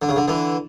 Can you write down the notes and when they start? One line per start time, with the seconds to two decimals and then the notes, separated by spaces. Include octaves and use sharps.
0.02 D3
0.09 C#3
0.16 D3
0.28 D3 E3